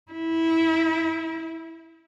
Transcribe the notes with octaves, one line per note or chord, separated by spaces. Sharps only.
E4